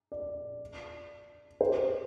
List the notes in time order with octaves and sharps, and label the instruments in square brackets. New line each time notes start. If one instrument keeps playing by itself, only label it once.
[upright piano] D5
C5